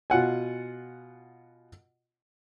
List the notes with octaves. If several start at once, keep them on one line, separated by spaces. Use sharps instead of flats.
B2 F4 F#5 G#5